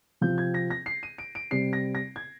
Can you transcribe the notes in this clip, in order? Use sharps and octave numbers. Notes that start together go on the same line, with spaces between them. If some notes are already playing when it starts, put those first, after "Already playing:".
C3 F3 C4 G6
G#6
A#6
A#6
C7
D#7
D7
D7
C3 G3 C4 C7
A#6
A#6
G#6